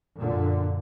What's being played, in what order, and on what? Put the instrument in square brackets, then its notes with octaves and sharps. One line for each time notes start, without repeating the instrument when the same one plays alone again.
[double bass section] F#2 A#2 D3